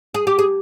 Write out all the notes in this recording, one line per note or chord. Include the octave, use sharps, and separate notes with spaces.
G#4
G4
G#4